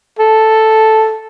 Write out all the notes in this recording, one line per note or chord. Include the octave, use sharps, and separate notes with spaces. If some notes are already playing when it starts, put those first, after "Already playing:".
A4